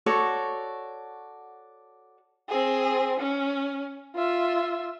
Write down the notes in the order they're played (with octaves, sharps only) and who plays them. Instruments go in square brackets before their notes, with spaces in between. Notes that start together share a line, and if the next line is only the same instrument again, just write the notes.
[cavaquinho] F#4 A4 C#5 D5
[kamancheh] C4 G#4
C#4
F4 E5